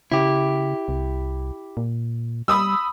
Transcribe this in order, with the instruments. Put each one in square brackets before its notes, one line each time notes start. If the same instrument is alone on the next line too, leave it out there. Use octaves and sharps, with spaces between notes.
[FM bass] C#3 [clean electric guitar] E4 G4
[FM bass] C2
A#2
[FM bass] G3 [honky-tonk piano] B5 D#6 E6